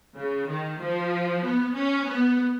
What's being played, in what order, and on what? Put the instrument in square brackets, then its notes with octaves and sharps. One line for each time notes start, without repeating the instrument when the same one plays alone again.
[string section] C#3
D#3
F3
B3
C#4
B3